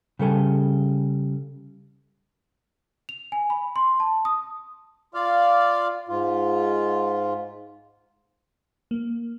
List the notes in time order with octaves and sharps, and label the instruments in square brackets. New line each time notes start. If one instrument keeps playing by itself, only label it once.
[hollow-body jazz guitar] C#3 G3 A4 G#5
[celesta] F7
G#5
B5
C6
A5
D#6
[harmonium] F4 D5 F5
G#2 F4
[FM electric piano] A#3